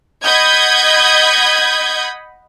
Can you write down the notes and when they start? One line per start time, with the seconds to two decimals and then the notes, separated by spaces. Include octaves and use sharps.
0.24 D#5 F#5 B5 D#6 G6 G#6